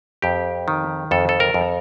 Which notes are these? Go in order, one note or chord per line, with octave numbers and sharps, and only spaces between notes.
F2 G4
D#3
F2 A4
A4
A#4
F2